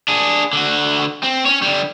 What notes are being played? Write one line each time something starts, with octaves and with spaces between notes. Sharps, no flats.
D4 G#4
D3 F#4
C4
C#4 C#5
D3 G3